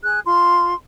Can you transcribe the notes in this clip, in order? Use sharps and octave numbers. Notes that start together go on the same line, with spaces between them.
G#4 F#6
F4 C6